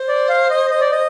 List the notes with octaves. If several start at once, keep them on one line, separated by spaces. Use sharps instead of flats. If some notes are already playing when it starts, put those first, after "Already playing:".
Already playing: C5
D5
F5
D#5
D#5
D5
D#5